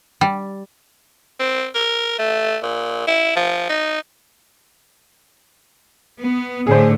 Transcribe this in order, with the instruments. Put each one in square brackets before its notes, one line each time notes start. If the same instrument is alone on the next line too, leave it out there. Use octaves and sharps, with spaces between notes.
[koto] G3
[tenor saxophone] C4
A#4
A3
A#2
E4
F3
D#4
[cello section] B3
[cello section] A2 D3 A3 [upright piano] G#4 C5